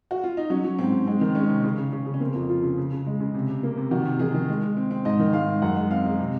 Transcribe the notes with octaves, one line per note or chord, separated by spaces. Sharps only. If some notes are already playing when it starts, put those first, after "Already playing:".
F#4
F4
D#4
F#3 C#4
F#3
G#2 C4
G#2
G#3 C4
D#3
G#3 C#4
C3
C#3 C#4
C#3
C#3 C#4
C#3
C#4
A#3 C4
F2
F3 F4
C#3
C#3
C#3
G#3
C#3
C3
C3
A#3
C3
D#3 F#4
C3
D#3 G#4
D#3
G#3
G#3
C4
C4
G#2 D#5
D#3
G#2 F5
G#2
F#2 F#5
G#3
C4 F5
G#3
C3